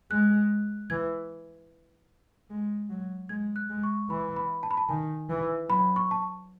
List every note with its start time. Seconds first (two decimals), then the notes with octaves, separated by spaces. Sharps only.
0.11 G#3 F#6
0.90 E3 G#6
2.50 G#3
2.90 F#3
3.29 G#3 G#6
3.56 F#6
3.70 G#3
3.83 C#6
4.10 E3 B5
4.36 B5
4.63 A5
4.71 B5
4.77 A5
4.89 D#3 G#5
5.29 E3
5.69 F#3 B5
5.96 C#6
6.11 A5